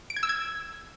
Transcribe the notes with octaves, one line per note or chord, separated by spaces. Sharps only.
D7
G#6
E6
G#6